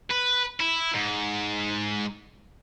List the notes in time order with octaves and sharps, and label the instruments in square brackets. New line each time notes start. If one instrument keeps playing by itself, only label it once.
[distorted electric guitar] B4
E4
G#2